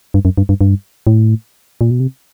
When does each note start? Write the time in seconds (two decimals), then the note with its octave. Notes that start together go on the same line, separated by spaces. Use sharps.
0.14 G2
0.25 F#2
0.38 G2
0.49 G2
0.61 G2
1.07 A2
1.81 A#2
1.91 B2
2.00 C3